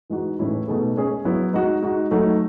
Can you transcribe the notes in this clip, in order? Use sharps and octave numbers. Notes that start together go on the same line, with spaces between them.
E3 G#3 D#4 F#4
A2 E3 G#3 C#4 E4
B2 A3 D#4 G#4
G#3 C#4 G#4
F#3 B3 E4
G#3 D#4 F#4
G#3 D#4 F#4
F#3 A3 D#4 F#4